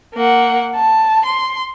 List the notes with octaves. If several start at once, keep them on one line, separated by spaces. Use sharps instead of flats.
A#3 F#5
A5
C6